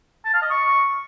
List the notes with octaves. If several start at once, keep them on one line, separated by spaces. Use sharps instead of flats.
A5
F5
D#5
C#6